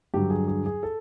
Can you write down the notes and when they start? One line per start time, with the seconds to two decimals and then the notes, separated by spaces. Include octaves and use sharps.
0.14 G2 D3 F#3 G4
0.30 G#4
0.48 G#4
0.66 G#4
0.83 A4